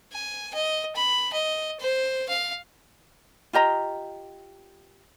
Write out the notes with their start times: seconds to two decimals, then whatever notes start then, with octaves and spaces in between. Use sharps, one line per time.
0.12 G#5
0.54 D#5
0.96 B5
1.33 D#5
1.80 C5
2.29 F5
3.53 F4 G4 D#5 A#5